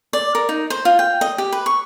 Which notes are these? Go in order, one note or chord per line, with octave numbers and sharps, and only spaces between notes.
D5
A#4
D#4
C5
F4
G5
D#5
G4
B4
C#6